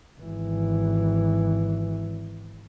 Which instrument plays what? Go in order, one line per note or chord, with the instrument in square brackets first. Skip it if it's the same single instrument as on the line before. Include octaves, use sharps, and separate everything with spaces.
[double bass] G#1 E3